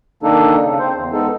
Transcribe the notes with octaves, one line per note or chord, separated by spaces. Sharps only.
D#3 A#3 D4 D#4 A4
C#3
C4 C5
E2
G#3 B3 D#4 A4